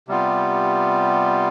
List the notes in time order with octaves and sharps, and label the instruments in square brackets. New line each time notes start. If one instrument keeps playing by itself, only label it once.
[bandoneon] C3 G3 B3 F4